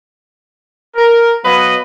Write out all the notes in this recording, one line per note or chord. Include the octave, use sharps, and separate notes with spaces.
A#4
F#3 B3 B4 D#5 F5